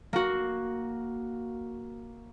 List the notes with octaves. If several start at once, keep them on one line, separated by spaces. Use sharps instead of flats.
A#3 F#4